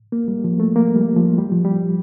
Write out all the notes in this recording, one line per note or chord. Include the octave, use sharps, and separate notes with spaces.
A#3
G3
F3
A3
A#3
G3
F3
G3
F3
G3